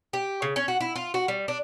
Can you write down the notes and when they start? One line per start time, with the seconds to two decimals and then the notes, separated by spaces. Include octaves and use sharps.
0.13 G4
0.42 C#3
0.56 C#4
0.68 F#4
0.81 E4
0.96 F4
1.14 F#4
1.28 G3
1.48 D4